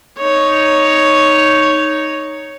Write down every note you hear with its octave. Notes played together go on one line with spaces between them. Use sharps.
D#4 C#5